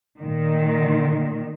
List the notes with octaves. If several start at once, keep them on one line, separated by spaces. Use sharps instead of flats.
A#2 D#3